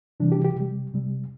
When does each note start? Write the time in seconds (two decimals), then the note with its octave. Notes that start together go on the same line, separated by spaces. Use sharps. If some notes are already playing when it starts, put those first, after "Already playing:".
0.20 C3 E3 G3 D4
0.32 G4
0.45 G4
0.56 C3 G3
0.94 C3 G3